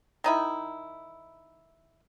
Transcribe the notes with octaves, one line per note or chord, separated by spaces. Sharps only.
D#3 D#4 E4